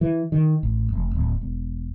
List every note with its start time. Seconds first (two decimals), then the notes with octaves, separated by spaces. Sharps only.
0.01 E3
0.32 D#3
0.63 A1
0.92 F1
1.15 D1
1.41 E1